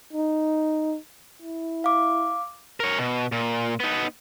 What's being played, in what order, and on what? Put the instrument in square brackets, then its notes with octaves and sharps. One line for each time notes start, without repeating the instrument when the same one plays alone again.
[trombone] D#4
E4
[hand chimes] F5 D6
[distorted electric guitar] A#4 C#5
B2
A#2
B3 D#4